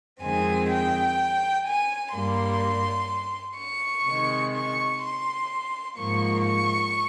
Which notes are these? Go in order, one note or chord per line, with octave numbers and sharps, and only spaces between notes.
F2 D#3 G#3 C4 G#5
G5
G#5
G2 G3 A#3 C6
C#6
C3 D#3 G#3
C#6
C6
G#2 F3 A#3 C#6
C#6